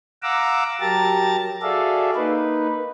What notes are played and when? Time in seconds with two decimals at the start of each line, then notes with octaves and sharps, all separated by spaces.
0.23 F5 F#5 A#5 D6 E6
0.81 F#3 G4 A#4 A5 A#5 A6
1.62 F#4 G#4 A4 D5 E5 F5
2.16 A#3 D#4 B4